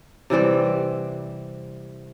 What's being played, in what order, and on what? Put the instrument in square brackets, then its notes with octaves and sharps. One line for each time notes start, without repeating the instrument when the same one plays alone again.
[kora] C3 E3 G3 C4